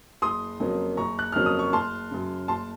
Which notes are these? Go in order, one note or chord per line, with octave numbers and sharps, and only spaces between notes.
F#1 C6 D#6
F2 C#3 F#3 A#3
F#1 A#5 C#6
F#6
F2 C#3 F#3 A#3 F6
D#6
C#6
F#1 A5 C6
F#2 C#3
F#1 A5 C6